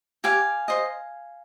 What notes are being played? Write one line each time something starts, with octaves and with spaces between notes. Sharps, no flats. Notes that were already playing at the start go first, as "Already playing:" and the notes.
G4 F5 G#5
C5 D#5